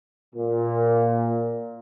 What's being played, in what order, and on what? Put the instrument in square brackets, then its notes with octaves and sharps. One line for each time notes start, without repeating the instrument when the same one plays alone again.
[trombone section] A#2